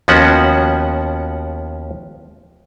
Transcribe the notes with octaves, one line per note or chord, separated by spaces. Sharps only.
D#2 F3 B3 C#4 F#4 F#5